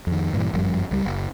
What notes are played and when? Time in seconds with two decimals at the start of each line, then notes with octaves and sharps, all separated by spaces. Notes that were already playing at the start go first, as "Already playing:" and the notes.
0.07 F2 D#3
0.33 G2 A#2 C#3 E3
0.53 G1 F#2 F3 G3
0.91 C#2 G3
1.05 F#1